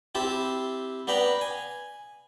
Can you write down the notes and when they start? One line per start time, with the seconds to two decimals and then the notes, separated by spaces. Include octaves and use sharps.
0.15 C4 E4 G4 A5
1.07 B3 D4 G5 A#5 B5
1.41 G#5